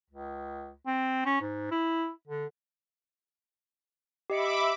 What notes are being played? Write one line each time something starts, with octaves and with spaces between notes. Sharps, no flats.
C#2
C4
C#4
G#2
E4
D3
G4 D#5 E5 B5 D6 C#7